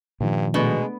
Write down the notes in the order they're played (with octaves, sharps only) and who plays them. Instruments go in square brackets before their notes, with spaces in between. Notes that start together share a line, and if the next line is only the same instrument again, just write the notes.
[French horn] G2 [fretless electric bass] A#2 D#3 F3
[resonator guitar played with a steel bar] B2 [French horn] G#3 [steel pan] A3 B3 D4